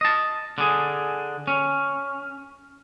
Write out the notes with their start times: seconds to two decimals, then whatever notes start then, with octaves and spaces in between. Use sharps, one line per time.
0.01 D#5 A5
0.58 D3 G#4
1.47 C#4